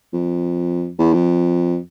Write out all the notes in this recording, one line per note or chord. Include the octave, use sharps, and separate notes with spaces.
F2
E2
F2